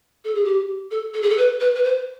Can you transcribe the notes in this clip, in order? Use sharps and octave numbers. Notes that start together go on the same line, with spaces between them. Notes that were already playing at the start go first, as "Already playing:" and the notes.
A4
G#4
G4
A4
A4
G#4
A4
B4
B4
B4
C5